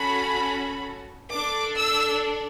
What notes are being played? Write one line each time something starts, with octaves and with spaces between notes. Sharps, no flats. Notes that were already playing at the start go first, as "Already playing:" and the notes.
Already playing: C#4 F#4 A4 B5
D4 A4 D6
E6